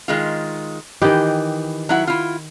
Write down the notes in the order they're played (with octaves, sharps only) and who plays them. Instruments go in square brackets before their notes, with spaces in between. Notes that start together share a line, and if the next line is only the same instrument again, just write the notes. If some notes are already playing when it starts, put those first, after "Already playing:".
[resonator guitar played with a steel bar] D#3 G#3 F4
[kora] D#3 G4 [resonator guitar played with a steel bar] E3 D#5
[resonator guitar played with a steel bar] F#3 E4 F#5
E4 F4